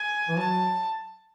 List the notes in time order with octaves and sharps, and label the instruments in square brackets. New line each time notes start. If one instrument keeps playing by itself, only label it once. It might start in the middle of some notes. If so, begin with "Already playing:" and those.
Already playing: [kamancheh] G#5
[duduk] E3
[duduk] F#3 [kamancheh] A5